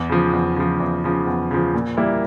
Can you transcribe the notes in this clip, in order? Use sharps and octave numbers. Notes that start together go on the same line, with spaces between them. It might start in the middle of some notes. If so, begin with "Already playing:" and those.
Already playing: E2
C#3 F3
E2
C#3 F3
E2
C#3 F3
E2
C#3 F3
A#2
G3 A#3 E4 A#4